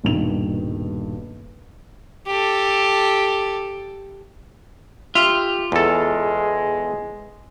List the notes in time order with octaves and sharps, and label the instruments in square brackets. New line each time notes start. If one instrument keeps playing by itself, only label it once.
[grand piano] D#1 G2 B2 D#3 F7
[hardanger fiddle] G4 A4
[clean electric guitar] F4 [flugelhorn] G4 [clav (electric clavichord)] E5
[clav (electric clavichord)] E2 A4 [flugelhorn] G#3